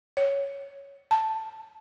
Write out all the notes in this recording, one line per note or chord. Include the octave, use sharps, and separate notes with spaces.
C#5
A5